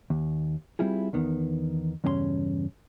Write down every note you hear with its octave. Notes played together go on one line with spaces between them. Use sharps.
D#2
G3 C4 E4 F4 G#4
E2 D#3 B3
E2 G2 C#3 C#4 B5 C6